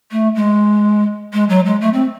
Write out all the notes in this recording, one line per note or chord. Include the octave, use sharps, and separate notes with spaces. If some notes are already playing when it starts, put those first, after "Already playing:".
A3
G#3
G#3
F#3
G#3
A3
C4